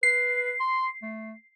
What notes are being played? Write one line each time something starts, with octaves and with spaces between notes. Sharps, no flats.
B4 C7
C6
A3